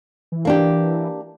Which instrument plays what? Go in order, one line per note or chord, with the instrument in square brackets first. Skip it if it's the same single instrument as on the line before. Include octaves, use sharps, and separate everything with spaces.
[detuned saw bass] E3
[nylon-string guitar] A#3 D4 G4